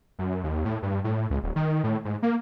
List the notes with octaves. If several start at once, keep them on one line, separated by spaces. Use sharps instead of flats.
F#2
D#2
A2
G2
A2
C#2
D#1
D#3
A2
G#2
A#3